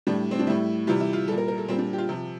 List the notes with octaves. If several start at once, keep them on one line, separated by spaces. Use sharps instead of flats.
A2 G3 D4
C4
D4
A2 G3 E4
C3 E3 G3 F4
E4
F4
A#2 G3 A4
A#4
A#4
A4
A#2 G3 C4
D4
G4
F4
C3 F3